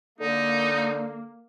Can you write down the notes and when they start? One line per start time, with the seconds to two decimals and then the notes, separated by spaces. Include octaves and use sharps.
0.21 D3 A#3 D#4